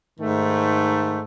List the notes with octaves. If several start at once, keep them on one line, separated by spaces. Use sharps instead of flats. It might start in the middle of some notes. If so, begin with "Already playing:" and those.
G#2 D#3 A3